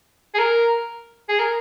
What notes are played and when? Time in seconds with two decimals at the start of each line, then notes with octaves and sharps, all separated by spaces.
0.34 G#4
0.39 A#4
1.29 G#4
1.39 A#4